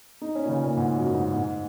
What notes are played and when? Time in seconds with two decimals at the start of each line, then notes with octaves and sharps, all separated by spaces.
0.22 D#4
0.35 C#4
0.45 A#2
0.49 C#3
0.64 A#2
0.77 G#2
0.96 F#2
1.15 G#2
1.34 G#2